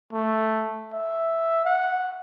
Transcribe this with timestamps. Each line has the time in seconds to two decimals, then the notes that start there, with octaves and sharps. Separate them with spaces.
0.13 A3
0.93 E5
1.65 F#5